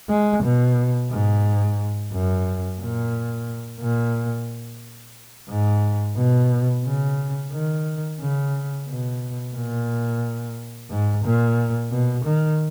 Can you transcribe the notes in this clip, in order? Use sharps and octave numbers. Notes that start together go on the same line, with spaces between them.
G#3
B2
G#2
F#2
A#2
A#2
G#2
B2
C#3
D#3
C#3
B2
A#2
G#2
A#2
B2
D#3